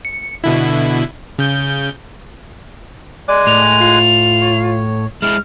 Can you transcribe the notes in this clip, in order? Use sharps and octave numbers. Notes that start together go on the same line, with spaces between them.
C#7
B2 D3 E4
C#3 G6
G#3 D5 G#5 F#6
A2 F7
F4
C#5
G#3 E4 F6